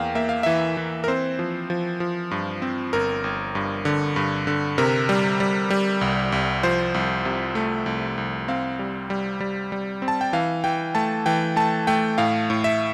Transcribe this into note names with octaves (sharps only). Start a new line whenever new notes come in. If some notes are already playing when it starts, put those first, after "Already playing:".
Already playing: E2 A#3 F5 G5
A#3 E5
F5
E3 E5
E3
A#4
C4 C5
F3
F3
F3
G2
C4
G1 A#4
G1
G2
D3
G2
D3
C3 A#4
G3
G3
G3
C2
C2
F3 C5
C2
C3
A3
C2
C2
C4 F5
G3
G3
G3
G3
C4
A5
G5
E3 F5
E3 G5
A3 A5
E3 G5
A3 A5
A3 G5
A2 F5
A2
E5